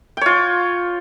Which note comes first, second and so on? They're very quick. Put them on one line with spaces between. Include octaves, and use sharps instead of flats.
G5 C#5 F4